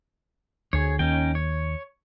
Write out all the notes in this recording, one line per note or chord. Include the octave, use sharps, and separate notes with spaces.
D2 G#4 C#5
D#2 C#4 D#4 G5
C#5